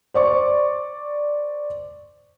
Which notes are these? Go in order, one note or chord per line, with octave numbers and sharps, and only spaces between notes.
C5 D5 C#6